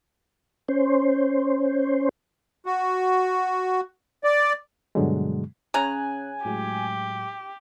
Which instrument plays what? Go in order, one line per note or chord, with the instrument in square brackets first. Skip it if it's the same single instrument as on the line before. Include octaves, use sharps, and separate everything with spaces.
[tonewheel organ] C#4 C5
[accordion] F#4
D5
[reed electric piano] G2 B2 D3 F#3 G#3
[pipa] C#3 A#5 [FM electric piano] C#4 F#6 [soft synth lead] G#5
[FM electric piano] A2 F#3 G#3 [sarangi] G4